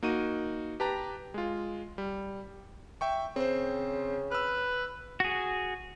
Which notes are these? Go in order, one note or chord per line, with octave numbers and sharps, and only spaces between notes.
A#3 D#4 F#4 D#7
G4 B4 A5 A#5
G#3 F4
G3
E5 G5 C#6
C#3 C4 C5
B4 E6 F6
F#4 G#4